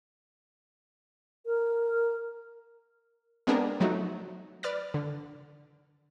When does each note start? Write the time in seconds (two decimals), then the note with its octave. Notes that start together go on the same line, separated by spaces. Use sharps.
1.46 A#4
3.47 G#3 B3 C4 D4 G#4 A#4
3.80 F3 F#3 A3 D#4 F#4
4.63 B4 D5 F6 A6
4.94 D3